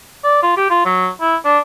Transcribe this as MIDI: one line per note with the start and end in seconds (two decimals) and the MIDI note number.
0.24 0.40 74
0.43 0.52 65
0.57 0.65 67
0.70 0.82 65
0.86 1.09 54
1.21 1.36 64
1.45 1.59 62